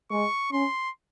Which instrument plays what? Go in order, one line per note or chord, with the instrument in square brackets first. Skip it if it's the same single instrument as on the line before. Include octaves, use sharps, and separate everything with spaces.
[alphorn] G#3 [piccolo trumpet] C#6
[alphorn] C#4 [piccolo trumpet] C6